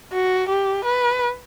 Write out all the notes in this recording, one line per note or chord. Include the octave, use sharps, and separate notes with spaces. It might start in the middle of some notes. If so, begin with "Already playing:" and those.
F#4
G4
B4